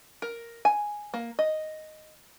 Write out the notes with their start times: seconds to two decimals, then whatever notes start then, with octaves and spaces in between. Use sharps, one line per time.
0.22 A#4
0.65 G#5
1.14 A#3
1.39 D#5